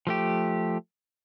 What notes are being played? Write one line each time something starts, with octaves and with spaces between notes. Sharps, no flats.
F3 A3 G4